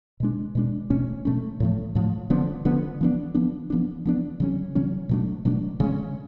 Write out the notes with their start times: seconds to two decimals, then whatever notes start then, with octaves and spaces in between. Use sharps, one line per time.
0.20 B2 G#3 D4
0.55 B2 G#3 D4
0.90 B2 A3 C#4
1.25 B2 A3 C#4
1.60 A2 F3 A3
1.95 A2 F3 A3
2.30 D3 F3 B3 D4
2.65 D3 F3 B3 D4
3.01 F3 B3 D4
3.35 F3 B3 D4
3.70 F3 B3 D4
4.05 F3 B3 D4
4.40 C#3 F#3 C#4
4.75 C#3 F#3 C#4
5.09 B2 F#3 A3 D4
5.45 B2 F#3 A3 D4
5.80 C#3 G#3 C#4